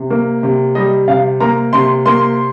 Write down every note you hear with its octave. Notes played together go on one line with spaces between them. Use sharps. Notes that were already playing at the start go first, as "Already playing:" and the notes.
Already playing: C3
A#3
C3
G3 D#5
C3 F5
A#3 A#5
C3 C6
A#3 C6